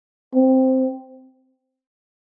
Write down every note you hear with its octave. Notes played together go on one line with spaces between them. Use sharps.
C4